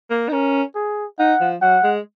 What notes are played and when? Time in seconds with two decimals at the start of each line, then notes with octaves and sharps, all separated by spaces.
0.10 A#3
0.29 D#4
0.32 C#4 A#4
0.75 G#4
1.19 D#4 F#5
1.41 F3
1.62 F#3 F#5
1.84 G#3